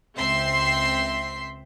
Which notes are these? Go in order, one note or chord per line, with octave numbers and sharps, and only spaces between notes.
C#2 C4 E5 C6 B6 C7